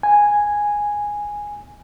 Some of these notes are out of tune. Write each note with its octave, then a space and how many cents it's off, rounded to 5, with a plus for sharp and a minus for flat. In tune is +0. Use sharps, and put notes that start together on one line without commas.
G#5 -5